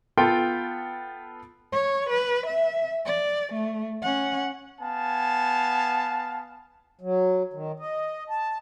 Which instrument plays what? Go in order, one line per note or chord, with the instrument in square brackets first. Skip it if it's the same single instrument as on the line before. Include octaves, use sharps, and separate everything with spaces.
[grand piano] B3 F4 A4 G5
[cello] C#5
B4
E5
D5
A3
C#4 F#5
[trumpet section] B3 F5 G#5 A5
[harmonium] F#3
D#3
D#5
A5